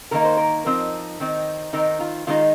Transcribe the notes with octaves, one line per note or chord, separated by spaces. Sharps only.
D#3 A#3 D#4 A#4
C5
A#4
F3 C4 D#4
D#3 C4 D#4
D#3 C4 D#4 A#4
F4
D#3 G#3 D#4 F4